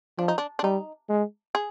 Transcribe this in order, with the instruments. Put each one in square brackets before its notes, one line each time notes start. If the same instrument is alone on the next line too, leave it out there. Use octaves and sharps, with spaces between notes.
[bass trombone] F3 [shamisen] D4
[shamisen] D#4
D4
D4
[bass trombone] G3 [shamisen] D#4
[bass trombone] G#3
[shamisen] G#4